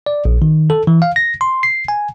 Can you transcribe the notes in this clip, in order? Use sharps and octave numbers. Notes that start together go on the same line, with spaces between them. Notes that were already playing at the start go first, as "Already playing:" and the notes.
D5
A#1
D#3
A4
E3
F5
A#6
C6
C7
G#5